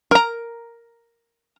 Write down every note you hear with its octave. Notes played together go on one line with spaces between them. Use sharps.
A#4 A#5